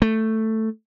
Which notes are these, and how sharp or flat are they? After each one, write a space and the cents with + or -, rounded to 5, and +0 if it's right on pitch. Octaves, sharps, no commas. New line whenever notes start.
A3 +5